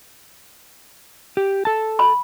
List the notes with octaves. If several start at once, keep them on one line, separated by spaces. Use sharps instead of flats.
G4
A4 A5
B5